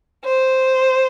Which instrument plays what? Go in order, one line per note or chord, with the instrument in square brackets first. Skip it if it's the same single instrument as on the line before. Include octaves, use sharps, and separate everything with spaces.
[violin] C5